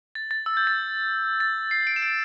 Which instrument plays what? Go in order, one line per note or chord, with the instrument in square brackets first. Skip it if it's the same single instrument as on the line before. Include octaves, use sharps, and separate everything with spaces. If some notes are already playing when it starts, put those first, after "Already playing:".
[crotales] A6
A6
E6
G6
A6
A6
C7
D7
E7
D7